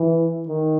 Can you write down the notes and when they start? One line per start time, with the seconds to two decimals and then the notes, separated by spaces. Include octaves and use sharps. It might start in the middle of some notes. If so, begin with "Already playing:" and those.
Already playing: E3
0.48 D#3